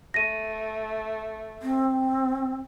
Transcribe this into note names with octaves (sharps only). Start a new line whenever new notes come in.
A3 A#6 D#7
C4